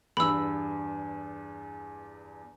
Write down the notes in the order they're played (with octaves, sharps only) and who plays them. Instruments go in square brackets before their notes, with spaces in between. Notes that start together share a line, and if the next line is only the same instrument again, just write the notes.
[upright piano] E2 G2 [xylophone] B5 E6